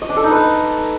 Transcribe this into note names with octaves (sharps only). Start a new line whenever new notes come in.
D#5
D4
A4
D#4
B4